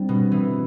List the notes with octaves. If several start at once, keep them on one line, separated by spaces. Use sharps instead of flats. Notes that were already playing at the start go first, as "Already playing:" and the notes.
Already playing: G3 C4 D4
B2
E3